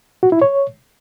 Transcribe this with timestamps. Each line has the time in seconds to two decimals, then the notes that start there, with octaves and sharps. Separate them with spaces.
0.23 F#4
0.32 E4
0.42 C#5